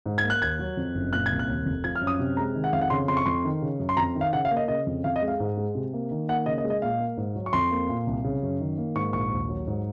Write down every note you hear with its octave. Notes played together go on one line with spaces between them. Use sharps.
G#2
G#6
A#3
F#6
D#2 G#6
F#3
F2
F#1
A#2 F#6
C2 G#6
F#6
D#2
F1
F3 G#6
F6
F#2
D#6
C3
G#3 A#5
D#3
F#5
F2 F5
F#5
C#3 C6
F2 C6
C#6
F2 C6
D#3
C#3
F#2
C6
F2 A#5
D#3
F5
C#3 F#5
F5
A#3
D#5
C#3 D#5
F2
F2 F5
D#5
G#3
F5
G#2
G#3
C3
A#3
D#3
A#3 F#5
C#3 D#5
D#5
G#3
D#5
A#2 F5
A#3
G#2
F#3
C#6
F2 C6
A#3
A#2
C2
C#3
F#2
D#3
A#3
G#2 C#6
A#1 C#6
D#2
F#3
G#2